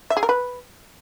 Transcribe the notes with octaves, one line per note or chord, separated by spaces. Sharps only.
E5
G#4
A#4
B4